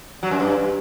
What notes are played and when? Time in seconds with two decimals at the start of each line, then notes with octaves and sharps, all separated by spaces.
0.23 F#3
0.31 F#2
0.40 G2